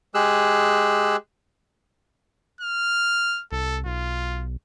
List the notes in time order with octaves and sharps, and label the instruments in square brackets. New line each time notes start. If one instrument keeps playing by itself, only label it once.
[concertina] G#3 G4 G#4 E6 F#6
[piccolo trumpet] F6
[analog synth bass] C2 [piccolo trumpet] A4
[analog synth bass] B1 [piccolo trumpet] F4